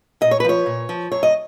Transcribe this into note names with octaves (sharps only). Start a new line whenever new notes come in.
A#2 D#5
C#5
B4
F3 C#5
A#2
F3
F#2 C#5
D#5